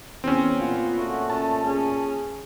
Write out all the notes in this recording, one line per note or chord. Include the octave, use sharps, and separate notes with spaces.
E2 C4 C#4
A#2 B3 F4
A3 F#4
C#4 A5
C#4 G#4